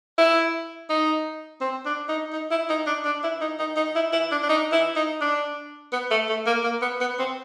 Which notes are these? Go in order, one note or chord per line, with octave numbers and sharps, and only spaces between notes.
E4
D#4
C4
D4
D#4
D#4
E4
D#4
D4
D4
E4
D#4
D#4
D#4
E4
E4
D4
D4
D#4
E4
D#4
D4
B3
A3
A3
A#3
A#3
B3
B3
C4